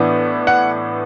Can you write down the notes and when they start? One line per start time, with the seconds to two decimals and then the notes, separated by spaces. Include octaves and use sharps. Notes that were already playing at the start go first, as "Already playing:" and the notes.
Already playing: A2 E3 B3 D4
0.47 F#5